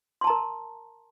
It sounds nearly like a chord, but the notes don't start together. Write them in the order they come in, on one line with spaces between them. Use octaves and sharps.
C6 A5 A#5 A#4